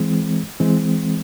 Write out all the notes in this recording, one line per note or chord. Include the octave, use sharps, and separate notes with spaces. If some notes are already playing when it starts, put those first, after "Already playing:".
Already playing: E3 G#3 C4
E3 G#3 C4